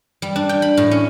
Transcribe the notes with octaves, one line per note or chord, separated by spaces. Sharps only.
G3
D4
G5
B5
A2
C#4